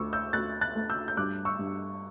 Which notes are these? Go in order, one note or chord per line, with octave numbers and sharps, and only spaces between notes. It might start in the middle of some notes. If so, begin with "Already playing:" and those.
Already playing: D2 C#6 D6 E6
E6 G6
D2 F#6 A6
F#6 A6
A3
E6 G6
G6
G2 D6 F#6
C#6 E6
G2